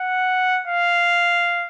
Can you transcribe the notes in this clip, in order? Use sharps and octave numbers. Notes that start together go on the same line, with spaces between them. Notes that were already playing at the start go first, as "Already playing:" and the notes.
Already playing: F#5
F5